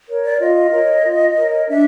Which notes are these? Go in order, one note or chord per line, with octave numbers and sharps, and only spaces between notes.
A#4 C#5
D5
F4 D#5
A#4 C#5
F4
A#4 C#5
D4 E5